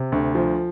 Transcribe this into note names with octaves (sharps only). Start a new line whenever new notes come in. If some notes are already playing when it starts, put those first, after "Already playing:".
Already playing: C3
D2
F3